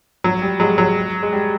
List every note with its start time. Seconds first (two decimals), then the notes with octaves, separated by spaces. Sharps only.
0.24 F#3
0.42 G3
0.60 F#3 G#3
0.78 F#3
1.23 G#3
1.33 G3